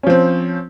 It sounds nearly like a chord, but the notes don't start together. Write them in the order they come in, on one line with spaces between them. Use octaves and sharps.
C#4 F3 C4